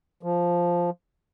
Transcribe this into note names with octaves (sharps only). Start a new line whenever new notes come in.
F3